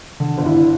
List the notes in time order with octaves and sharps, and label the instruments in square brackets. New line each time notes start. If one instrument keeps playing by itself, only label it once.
[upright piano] D3
G1
[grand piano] E4